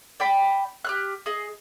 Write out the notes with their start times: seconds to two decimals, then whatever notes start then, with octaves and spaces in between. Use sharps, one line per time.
0.20 D5 G5 B5
0.85 G4 F6 F#6
1.26 G#4 D#5